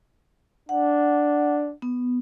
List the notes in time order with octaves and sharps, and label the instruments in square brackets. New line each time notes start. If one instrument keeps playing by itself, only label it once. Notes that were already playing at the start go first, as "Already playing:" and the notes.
[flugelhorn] D4 [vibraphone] F#5
[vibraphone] B3